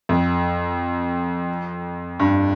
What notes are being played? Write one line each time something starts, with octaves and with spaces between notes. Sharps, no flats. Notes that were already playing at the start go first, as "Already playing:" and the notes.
F2
G2